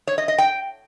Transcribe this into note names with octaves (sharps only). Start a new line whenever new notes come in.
C#5
D#5
D#5
G5